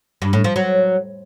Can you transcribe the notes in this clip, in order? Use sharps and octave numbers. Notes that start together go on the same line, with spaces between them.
G2
A2
F3
F#3